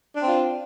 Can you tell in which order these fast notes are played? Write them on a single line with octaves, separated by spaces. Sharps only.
D4 C4 F4